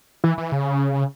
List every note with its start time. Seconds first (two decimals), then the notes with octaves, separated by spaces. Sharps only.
0.24 E3
0.38 E3
0.52 C#3